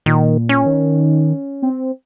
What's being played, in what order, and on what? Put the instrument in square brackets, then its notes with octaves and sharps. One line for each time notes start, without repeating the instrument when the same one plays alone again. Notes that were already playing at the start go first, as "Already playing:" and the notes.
[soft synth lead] A#2 [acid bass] D#3
[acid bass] C#4
[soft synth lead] D#3
C4